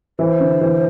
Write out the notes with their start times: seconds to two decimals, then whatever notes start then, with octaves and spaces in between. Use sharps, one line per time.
0.19 E3 C5
0.40 D3
0.61 E3